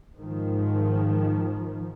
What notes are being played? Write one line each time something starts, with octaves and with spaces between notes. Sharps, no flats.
G#2 D#3 F3